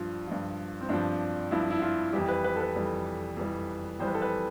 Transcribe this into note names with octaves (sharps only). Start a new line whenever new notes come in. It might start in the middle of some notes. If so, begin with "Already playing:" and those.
Already playing: G2 F3 F4
G2 F3
C4
G2 F3 D4
G2 F3 E4
E4
F4
F2 E3 G3 G4
B4
B4
A4
B4
F2 E3 G3
F2 E3 G3
F2 E3 G3 C5
B4
A4
B4